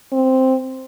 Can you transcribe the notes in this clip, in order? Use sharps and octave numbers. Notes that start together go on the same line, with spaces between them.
C4